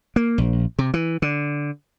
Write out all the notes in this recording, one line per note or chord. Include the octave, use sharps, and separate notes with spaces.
A#3
A#1
C3
E3
D3